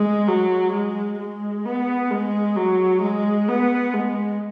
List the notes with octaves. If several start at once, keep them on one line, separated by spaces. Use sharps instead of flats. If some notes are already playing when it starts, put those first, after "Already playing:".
Already playing: G#3
F#3
G#3
G#3
B3
G#3
F#3
G#3
B3
G#3